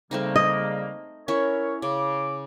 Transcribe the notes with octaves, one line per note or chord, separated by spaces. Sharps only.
C#3 G3 A3 A#3 C4 D#4
D#5
C#4 E4 A#4 C#5
C#3 D6